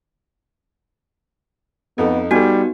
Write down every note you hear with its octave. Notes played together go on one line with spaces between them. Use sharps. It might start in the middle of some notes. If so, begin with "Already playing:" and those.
F2 B3 D#4 A4
G3 B3 D#4 F#4 A4 G#5